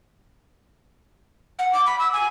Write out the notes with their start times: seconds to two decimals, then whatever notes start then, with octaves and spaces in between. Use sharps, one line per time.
1.59 F#5
1.73 D6
1.86 B5
1.99 E6
2.13 G#5